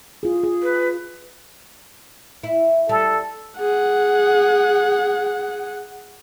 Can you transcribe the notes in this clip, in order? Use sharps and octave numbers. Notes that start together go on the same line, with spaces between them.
F4 G#4
G#4
B4
E4
G3 A4
G#4 F#5